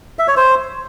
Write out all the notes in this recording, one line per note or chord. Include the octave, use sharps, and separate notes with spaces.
E5
C#5
C5